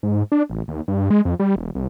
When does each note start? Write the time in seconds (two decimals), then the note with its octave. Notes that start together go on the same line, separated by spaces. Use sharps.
0.03 G#2
0.32 D4
0.50 A1
0.68 D#2
0.88 G2
1.10 G#3
1.25 F2
1.40 G3
1.56 E1
1.75 C2